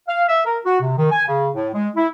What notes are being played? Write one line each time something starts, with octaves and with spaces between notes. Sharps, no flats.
F5
E5
A#4
F#4
C3
D#3
G#5
C#3
A2
G#3
E4